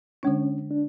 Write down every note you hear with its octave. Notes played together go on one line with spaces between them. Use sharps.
D3 G#3 C#4 D4
D4